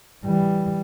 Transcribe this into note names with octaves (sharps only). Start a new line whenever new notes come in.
E3 G3